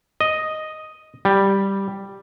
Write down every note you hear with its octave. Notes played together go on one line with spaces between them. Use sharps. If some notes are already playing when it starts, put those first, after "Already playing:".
D#5
G3